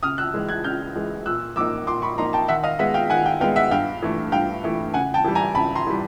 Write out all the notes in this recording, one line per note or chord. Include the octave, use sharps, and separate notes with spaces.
C#3 D#6 F6
E6 F#6
E3 G#3
F#6 G#6
C#3 F6 G6
E3 G#3
A#2 E6 F#6
F3 A#3 D#4 D6 E6
A#2 C6 D6
B5 C#6
F3 A#3 D#4 A#5 C6
G5 A5
D#3 E5 F#5
D#5 F5
G#3 B3 E5 F#5
F5 G5
D#3 F#5 G#5
F5 G5
G#3 B3 F5 G5
E5 F#5
G2 F5 G5
E3 A3
G2 F5 G5
E3 A3
C#3 F#5 G#5
G5 A5
E3 G3
G#5 A#5
C#3 A5 B5
A#5 C6
E3 G3